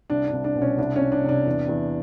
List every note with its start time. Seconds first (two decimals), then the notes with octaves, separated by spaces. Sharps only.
0.10 C2 D4
0.28 D4
0.33 C2
0.44 D4
0.55 B2
0.62 C#4
0.78 C2 D4
0.96 C#4
1.01 C2
1.12 D4
1.24 C3 D4
1.46 E2
1.69 E2